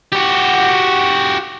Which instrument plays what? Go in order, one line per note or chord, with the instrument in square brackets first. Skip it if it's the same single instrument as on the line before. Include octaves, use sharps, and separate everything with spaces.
[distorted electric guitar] F#4 G4